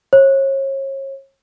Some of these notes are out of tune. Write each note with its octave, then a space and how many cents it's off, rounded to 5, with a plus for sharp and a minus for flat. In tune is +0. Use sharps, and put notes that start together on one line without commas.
C#5 -35